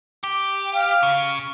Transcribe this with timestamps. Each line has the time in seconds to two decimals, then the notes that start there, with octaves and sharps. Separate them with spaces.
0.24 G4
0.74 F5
1.03 C#3